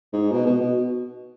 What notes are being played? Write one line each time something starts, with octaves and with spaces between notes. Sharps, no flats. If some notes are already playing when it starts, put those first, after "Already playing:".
G#2
B2
B2
B2